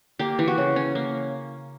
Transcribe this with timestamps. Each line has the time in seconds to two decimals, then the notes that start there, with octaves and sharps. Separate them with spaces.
0.19 A#3 G4
0.39 E3
0.47 F#4
0.58 C#3
0.76 C#4
0.95 A#3